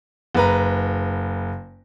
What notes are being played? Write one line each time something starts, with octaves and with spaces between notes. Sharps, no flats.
F#1 B4 A#5